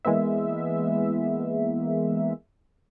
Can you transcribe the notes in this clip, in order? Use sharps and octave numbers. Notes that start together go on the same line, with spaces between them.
E3 G#3 A#3 B3 E5